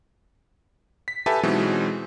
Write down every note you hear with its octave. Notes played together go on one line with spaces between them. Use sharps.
B6
G4 A4 B4 E5 G#5 A5
B2 E3 F#3 G#3 C4 D#4